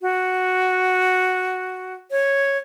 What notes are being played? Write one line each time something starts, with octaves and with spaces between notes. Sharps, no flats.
F#4
C#5